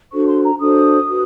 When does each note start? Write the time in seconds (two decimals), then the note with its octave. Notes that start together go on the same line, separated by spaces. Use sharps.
0.11 D4 F#4 A4 C5 C#6
0.27 C6
0.44 A#5
0.59 D4 F#4 A4 C5 D#6
1.08 F#4 B4